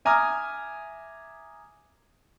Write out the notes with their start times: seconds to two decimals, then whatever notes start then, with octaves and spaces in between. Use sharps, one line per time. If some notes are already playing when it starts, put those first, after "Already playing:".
0.05 E5 G#5 A#5 D6 D#6 F6